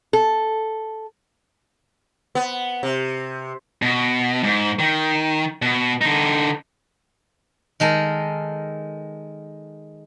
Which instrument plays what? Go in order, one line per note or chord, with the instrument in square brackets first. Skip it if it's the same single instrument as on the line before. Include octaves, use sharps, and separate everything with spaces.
[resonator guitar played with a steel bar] A4
[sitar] B3
C3
[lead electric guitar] B2
G#2
D#3
B2
D3 D#4
[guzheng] D#3 G#3 A4 A#4